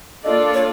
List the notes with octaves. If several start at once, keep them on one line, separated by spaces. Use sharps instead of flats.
A#3 D4 F4 A4 D5 D#5
C#5